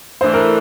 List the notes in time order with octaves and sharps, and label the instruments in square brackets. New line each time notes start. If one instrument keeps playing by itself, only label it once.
[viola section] E3 A3 D4 [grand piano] C5
[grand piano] A#4